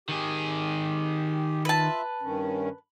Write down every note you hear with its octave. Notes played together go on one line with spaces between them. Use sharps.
D#3 G4 G#4
F4 B4 E5 A5
G2 D#3 C#4